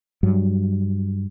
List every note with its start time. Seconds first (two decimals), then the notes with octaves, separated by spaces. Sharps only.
0.23 G2 F#3